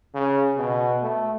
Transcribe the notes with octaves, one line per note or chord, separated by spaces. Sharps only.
C#3
B2
A3